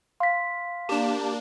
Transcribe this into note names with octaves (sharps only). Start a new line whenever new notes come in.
F5 C6 B6
A#3 D4 G4 A5